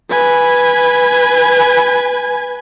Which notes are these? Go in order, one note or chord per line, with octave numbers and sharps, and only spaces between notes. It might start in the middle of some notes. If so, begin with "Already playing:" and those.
B4 G#5